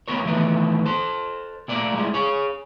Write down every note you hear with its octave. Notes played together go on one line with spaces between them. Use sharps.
A#3 B3 A#4 C#5
A2 D#3 E3 A3 B3
A4 C5
A#2 A3 A#3 D5
G3 G#3 E4
G#4 C#5